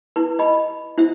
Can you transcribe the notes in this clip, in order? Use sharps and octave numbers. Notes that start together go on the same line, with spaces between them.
E4 B4
D#5 B5
E4 C5 E5